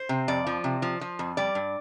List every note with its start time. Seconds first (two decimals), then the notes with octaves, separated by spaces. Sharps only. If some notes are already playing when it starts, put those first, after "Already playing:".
Already playing: C5
0.09 C3
0.28 F2 D5
0.47 F3
0.64 C3
0.82 F3
1.01 F3
1.19 F2
1.37 G3 D5
1.55 G2